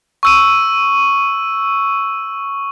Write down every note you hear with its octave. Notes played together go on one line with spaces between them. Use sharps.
C#6 E6 D#7